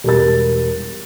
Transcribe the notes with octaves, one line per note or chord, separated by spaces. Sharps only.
E1 G3 A#4 A6